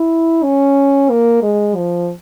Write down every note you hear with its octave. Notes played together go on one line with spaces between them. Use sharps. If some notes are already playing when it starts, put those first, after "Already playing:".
Already playing: E4
C#4
A#3
G#3
F3